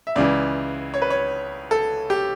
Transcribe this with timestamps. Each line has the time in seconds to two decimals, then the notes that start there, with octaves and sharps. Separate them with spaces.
0.07 E5
0.16 C#2 C#3 E3 D5
0.94 C#5
1.02 B4
1.10 C#5
1.71 A4
2.10 G4